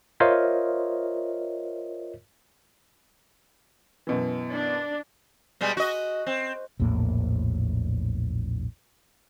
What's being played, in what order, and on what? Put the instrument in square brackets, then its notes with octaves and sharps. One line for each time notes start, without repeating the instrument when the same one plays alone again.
[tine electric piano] F4 A#4 C5 C#5 D#5 E5
[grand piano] F#2 B2 E3
[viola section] D4
[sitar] B2 G3 G#3
F#4 D#5
C4
[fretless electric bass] A#1 E2 A2 A#3